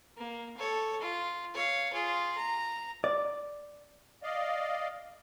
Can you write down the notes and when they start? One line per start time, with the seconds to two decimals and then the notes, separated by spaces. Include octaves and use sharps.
0.17 A#3
0.57 A4 C#5
1.01 F4
1.54 C#5 F5
1.93 F4 G#4
2.37 A#5
3.04 D5
4.23 D5 D#5 F5